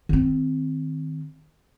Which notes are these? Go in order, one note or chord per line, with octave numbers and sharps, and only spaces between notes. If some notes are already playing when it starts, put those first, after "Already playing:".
D#3 C4